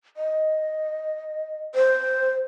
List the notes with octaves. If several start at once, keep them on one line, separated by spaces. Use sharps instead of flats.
D#5
C5